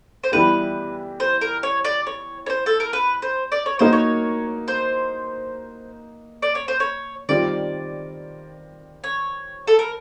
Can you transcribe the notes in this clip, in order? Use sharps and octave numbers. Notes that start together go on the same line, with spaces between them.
C5
E3 G3 B3 E4 G4 B4
C5
A#4
C#5
D5
C#5
C#5
C5
A4
A#4
B4
C5
D5
C#5
A#3 D#4 F#4 A#4 C5
C#5
C5
D5
C#5
C5
C#5
D#3 G3 C4 F4 D5
C#5
A4
A#4